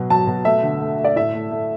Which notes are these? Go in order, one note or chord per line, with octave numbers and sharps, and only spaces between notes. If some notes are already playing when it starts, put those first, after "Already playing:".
Already playing: B2 F#3
F#3 A5
B2
A3 E5
D3
A3
A3
D5
A2 E5
A3
A3